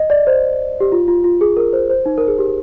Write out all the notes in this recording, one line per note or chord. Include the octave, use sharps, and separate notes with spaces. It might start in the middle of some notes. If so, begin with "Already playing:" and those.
Already playing: D#5
D5
C5
G4
F4
F4
F4
G#4
A#4
C5
C5
D#4
A#4
G#4
G4